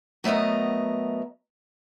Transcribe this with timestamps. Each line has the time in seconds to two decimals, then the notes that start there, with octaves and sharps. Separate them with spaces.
0.24 F#3 A3 B3 A#4 D#5